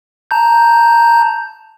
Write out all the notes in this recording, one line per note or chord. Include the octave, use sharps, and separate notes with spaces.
A5 A#5 G6